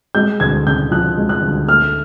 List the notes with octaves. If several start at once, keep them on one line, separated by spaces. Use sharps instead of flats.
G#3 G6
D2 G#6
C#3 G6
F3 F#6
G#3
F#6
D2
A3 F6